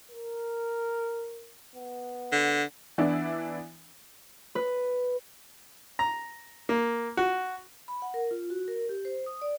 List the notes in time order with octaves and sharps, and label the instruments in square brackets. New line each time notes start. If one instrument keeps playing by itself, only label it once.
[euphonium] A#4
B3
[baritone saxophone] D3
[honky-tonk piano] E3 B3 D4 E4
[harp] B4
[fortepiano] A#5
A#3
F#4
[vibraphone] B5
F#5
A#4
F4
F#4
A#4
G4
C5
D#6
D5